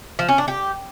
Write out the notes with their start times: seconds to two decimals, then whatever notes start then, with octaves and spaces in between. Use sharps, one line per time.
0.19 F3
0.28 C#4
0.38 D4
0.48 G4